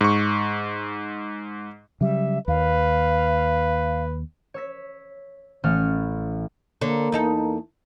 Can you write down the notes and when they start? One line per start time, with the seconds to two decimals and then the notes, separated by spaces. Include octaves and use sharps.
0.01 G#2 C#6
2.01 C#3 F#3 G3 E5
2.48 D#2 B4 F5
4.54 C#5 E6 B6
5.63 A1 A3 F6
6.81 D3 A#3 C#5
7.12 E2 D#4 A4